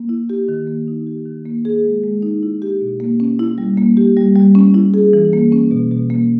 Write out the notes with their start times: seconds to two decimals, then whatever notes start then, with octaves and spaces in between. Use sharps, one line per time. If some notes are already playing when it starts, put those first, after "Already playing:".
Already playing: A#3
0.09 E4
0.30 G4
0.49 D#3
0.67 A#3
0.88 D#4
1.07 G4
1.26 D#3
1.45 A#3
1.65 G#4
1.84 G#3
2.04 G#3
2.22 D#4
2.43 E4
2.62 G4
2.81 B2
3.00 A#3
3.20 C#4
3.39 E4
3.58 G3
3.78 A#3
3.97 G4
4.17 G3
4.35 G3
4.55 C#4
4.74 E4
4.94 G#4
5.13 E3
5.33 A#3
5.52 C#4
5.71 B2
5.91 B2
6.10 A#3